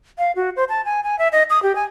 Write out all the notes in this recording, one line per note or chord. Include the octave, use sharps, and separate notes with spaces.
F5
F#4
C5
A5
G#5
G#5
E5
D#5
D#6
G4
G#5